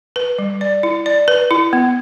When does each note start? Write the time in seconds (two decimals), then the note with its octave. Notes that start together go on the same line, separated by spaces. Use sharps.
0.16 B4
0.38 G3
0.61 D5
0.83 E4
1.06 D5
1.28 B4
1.51 E4
1.73 B3